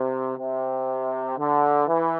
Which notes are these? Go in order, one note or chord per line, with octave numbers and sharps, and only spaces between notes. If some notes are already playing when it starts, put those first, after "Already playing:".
Already playing: C3
C3
D3
E3